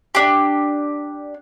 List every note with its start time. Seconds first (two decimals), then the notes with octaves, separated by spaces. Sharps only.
0.15 D4 G4